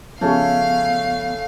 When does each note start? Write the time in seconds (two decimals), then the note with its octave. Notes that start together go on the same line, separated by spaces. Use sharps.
0.21 C#3 F3 A3 B3 C#4 F5